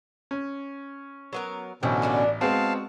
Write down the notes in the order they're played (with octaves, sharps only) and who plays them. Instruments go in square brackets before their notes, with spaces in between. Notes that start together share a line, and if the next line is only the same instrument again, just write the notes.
[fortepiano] C#4
[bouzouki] F#3 B3 A#4
[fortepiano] A1 [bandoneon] B2 D3 C#4 [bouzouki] C4
[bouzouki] A3 A#3 D4
[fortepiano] G#3 B3 C4 [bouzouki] F#4 [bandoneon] F5 A5